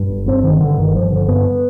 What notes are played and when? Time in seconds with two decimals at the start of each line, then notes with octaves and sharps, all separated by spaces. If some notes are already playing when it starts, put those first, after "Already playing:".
Already playing: G2
0.10 G1
0.27 G1 C4
0.43 D3 D#3
0.60 G2 D3
0.77 G1 D#3
0.95 G1 F3
1.12 D3
1.28 G2 B3